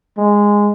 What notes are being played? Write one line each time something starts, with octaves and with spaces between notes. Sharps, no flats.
G#3